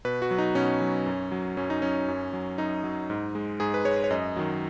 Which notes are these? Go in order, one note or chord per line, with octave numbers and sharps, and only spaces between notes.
B2 B4
F#4
F#3
D#4
B2 C#4
F#3
F#2
F#3
F#2 C#4
D#4
F#3 C#4
F#2
F#3
F#2 D#4
F#3
G#2
G#3
G#2 G#4
B4
G#3 C#5
C#5
F#2 D#5
D#3 F#3